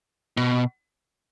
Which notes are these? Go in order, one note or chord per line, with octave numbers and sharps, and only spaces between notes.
B2